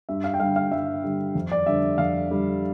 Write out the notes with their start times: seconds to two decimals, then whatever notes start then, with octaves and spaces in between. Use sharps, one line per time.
0.09 G2 E5
0.24 F5
0.34 G5
0.40 D3 G3 F5
0.56 F5
0.71 G2 E5
1.04 D3 G3
1.35 F2
1.52 D5
1.66 D3 G3 E5
1.98 F2 F5
2.30 D3 G3